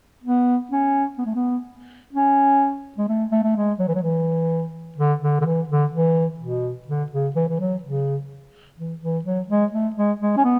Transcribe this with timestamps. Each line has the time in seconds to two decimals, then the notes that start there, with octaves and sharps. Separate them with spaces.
0.24 B3
0.71 C#4
1.18 B3
1.26 A3
1.35 B3
2.13 C#4
2.98 G#3
3.08 A3
3.31 A3
3.43 A3
3.56 G#3
3.79 F#3
3.88 E3
3.95 F#3
4.03 E3
4.98 D3
5.22 D3
5.41 D3
5.45 E3
5.69 D3
5.93 E3
6.40 B2
6.88 D3
7.12 C#3
7.35 E3
7.48 E3
7.60 F#3
7.83 C#3
8.78 E3
9.02 E3
9.25 F#3
9.48 G#3
9.72 A3
9.96 G#3
10.20 G#3
10.37 C#4
10.44 B3